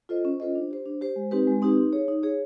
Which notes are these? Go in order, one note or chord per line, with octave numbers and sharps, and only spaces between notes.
F4 A4 C5 D#5
C#4
F4 A4 C5 D#5
D4
G4 C5
D4
G4 C5
G#3
C4 D#4 G4 B4
G#3
C4 D#4 G4 B4
D#4
G#4 C#5
D#4
G#4 C#5